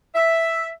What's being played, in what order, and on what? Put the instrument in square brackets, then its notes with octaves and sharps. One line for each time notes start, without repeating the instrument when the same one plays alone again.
[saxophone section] E5